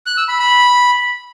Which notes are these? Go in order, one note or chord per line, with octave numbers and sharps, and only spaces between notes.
F#6
E6
B5
B5